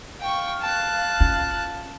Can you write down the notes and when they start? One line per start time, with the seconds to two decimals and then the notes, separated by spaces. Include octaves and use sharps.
0.21 F5 G5 C#6
0.62 A5 F#6
1.20 C#4 F4